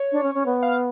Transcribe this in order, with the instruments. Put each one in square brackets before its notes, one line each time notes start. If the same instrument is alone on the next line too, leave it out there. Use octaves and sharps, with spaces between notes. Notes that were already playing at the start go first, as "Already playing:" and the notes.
Already playing: [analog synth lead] C#5
[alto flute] D4
C#4
C#4
B3
[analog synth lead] F5